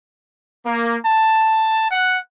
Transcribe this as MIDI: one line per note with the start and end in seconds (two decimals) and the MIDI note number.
0.65 0.96 58
1.05 1.84 81
1.91 2.18 78